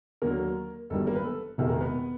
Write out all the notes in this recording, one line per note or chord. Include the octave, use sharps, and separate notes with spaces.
D#2 D3 F#3 A#3 A#4
G1 F#2 D#3 G3 A4
A#3 A#4
B3 B4
A4
E1 E2 C3 D#3 G#3 A4
A#3 A#4
B3 B4